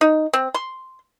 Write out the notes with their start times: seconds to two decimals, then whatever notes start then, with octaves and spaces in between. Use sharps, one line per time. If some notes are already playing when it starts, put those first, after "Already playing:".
0.01 D#4
0.33 C4
0.54 C6